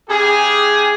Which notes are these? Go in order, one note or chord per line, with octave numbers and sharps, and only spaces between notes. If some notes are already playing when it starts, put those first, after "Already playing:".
C#3 G4 G#4